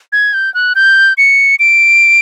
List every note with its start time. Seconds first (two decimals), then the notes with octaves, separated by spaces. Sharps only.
0.13 G#6
0.34 G6
0.54 F#6
0.75 G6
1.18 C#7
1.59 D7